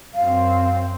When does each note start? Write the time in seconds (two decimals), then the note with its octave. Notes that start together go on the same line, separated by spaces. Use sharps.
0.14 F#2 C4 F5